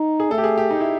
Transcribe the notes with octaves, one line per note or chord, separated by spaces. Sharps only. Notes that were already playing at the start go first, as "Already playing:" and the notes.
Already playing: D#4
G#4
A3 A4
G4
G#4
G4
D#4
E4